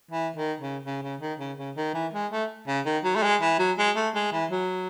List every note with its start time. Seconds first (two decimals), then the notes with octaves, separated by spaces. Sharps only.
0.11 E3
0.36 D#3
0.60 C#3
0.85 C#3
1.03 C#3
1.21 D#3
1.39 C#3
1.58 C#3
1.76 D#3
1.94 E3
2.13 G#3
2.32 A3
2.67 C#3
2.85 D#3
3.04 F#3
3.15 A3
3.23 G#3
3.41 E3
3.59 F#3
3.78 G#3
3.96 A3
4.15 G#3
4.32 E3
4.51 F#3